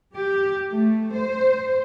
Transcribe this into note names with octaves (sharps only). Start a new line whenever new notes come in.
G4
A3
C5